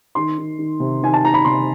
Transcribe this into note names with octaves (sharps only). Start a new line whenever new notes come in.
D#3 C6
D#3
D#3
C3
D#3 G#5
A5
D#3 A#5
B5
C3 C6